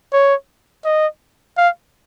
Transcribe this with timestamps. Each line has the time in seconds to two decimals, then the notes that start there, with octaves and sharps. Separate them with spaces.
0.13 C#5
0.85 D#5
1.57 F5